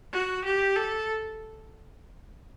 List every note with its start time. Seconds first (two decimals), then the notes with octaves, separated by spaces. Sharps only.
0.13 F#4
0.45 G4
0.76 A4